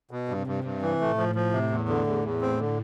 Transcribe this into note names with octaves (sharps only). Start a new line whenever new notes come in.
B2
G2 C3
G2
G2
E3
A2 A3
F3
F3
C3
E2
D3
E2
E2
C4
D3